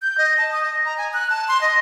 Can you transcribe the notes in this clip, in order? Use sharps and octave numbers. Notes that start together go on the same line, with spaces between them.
G6
D#5
A5
D#6
D#5
A#5
G#5
F#6
A5
C6
D#5